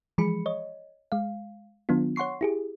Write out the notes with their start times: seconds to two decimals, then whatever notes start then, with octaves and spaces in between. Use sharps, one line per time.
0.18 E3 F3 G#3 G#4 B5 C#7
0.46 C#5 D#5
1.12 G#3 F5
1.89 D#3 F#3 B3 D4 F4
2.16 C#5 F#5 C6 C#6 C7
2.41 E4 G4 G#4